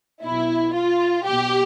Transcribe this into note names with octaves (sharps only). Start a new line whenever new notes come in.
B1 B2 E4
F4
B1 B2 G4